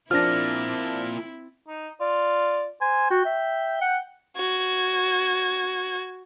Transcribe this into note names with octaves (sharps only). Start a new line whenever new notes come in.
F3 A#3 C4 D4 E4 F4 F6 A#6
D#4
F4 D5
C5 G#5
F#4 G5
E5
F#5
F#4 G#6